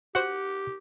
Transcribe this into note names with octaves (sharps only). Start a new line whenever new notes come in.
F#4 G4 C5 F#5